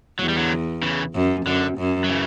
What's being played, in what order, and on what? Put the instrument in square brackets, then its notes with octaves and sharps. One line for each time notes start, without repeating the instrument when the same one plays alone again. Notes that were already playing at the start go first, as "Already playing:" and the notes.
[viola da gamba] E2 [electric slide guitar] F#3
[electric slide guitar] G3
D3 F#3
C#3 E3
[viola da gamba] F#2
[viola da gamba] F#2 [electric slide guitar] D3
[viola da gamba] F#2
[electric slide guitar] F#3
C#3 E3